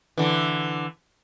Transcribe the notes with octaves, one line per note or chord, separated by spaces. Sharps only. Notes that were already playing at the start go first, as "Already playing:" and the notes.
D3 E3